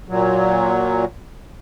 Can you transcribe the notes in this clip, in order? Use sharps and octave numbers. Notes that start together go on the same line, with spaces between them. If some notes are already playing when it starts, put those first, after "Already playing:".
A#2 F#3